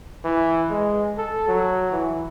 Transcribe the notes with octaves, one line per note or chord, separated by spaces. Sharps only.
E3
G#3
A4
F#3
E3